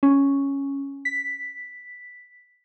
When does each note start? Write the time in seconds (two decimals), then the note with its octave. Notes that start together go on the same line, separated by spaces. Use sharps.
0.03 C#4
1.05 B6